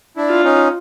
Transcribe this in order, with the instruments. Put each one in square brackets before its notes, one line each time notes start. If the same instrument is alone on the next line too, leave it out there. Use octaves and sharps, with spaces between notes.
[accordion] D4 E4
[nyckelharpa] F4
[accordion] C#4 D#4